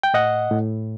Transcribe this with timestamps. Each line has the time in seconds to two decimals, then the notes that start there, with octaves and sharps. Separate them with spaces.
0.03 G5
0.14 A2 D#5 F#5
0.51 A2